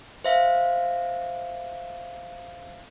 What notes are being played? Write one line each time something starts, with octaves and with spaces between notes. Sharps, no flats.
C5 E5 F5